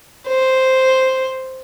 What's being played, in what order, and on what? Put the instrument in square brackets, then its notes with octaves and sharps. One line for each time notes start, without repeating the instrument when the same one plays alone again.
[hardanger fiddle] C5